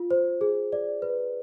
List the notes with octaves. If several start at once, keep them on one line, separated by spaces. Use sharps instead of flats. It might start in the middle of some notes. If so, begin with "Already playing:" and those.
Already playing: F4
C5
G#4
D5
B4